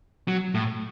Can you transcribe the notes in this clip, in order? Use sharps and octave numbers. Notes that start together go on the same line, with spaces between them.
F#3
A2